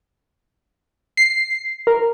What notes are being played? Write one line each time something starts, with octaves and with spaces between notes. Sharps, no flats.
C7
A#4